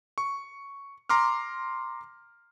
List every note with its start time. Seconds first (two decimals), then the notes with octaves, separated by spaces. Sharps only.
0.18 C#6
1.09 A#5 C6 D6 F6